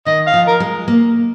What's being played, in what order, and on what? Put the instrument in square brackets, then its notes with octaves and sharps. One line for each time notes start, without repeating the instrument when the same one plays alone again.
[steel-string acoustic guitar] D#3 [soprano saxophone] D#5
[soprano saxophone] F5
[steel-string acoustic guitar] F3
[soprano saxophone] A#4
[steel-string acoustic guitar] G#3
A#3